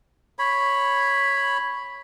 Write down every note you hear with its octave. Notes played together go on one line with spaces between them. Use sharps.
C#5 B5